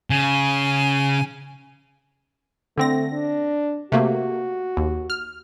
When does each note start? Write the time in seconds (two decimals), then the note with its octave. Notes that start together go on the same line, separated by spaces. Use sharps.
0.10 C#3 G#5
2.78 D3 A3 C4 A#6
3.13 D4
3.92 C3 A3 A#3 F#4
4.77 D#2
5.10 F6